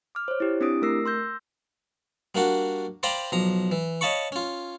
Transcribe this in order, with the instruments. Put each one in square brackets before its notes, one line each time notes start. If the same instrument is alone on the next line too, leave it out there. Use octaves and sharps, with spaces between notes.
[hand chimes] D6 F6
C5 C#5
E4 G4
C4 D4 E4 G4 D#6 D7
A3 A#4 E6 A#6 C7
C6 E6 G6 A#6
[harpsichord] G3 A#3 D4 F#4
C5 D5 F5 G5 A#5 B5
B1 F3 A#5
E3
C#5 D#5 F5 A5 B5 C#6
C#4 F4